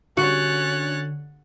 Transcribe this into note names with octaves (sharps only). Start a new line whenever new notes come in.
D3 C#4 F#4 C#5 F#6 A6